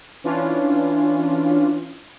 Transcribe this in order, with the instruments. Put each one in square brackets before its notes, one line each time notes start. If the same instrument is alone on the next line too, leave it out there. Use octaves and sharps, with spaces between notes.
[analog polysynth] E3 C#4 D4 F4